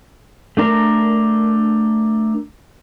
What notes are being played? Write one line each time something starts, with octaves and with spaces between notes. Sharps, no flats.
A3 D4 A#4